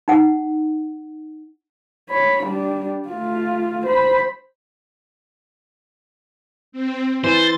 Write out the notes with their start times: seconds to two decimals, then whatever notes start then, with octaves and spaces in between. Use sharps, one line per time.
0.08 D#4 F#5
2.10 C#5 B5
2.44 G3 D4
3.09 A3 F4
3.86 C5 B5
6.72 C4
7.24 E3 C5 A6 D#7